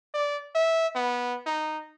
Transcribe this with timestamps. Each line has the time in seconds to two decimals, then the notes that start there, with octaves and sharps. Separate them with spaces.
0.14 D5
0.55 E5
0.95 B3
1.46 D#4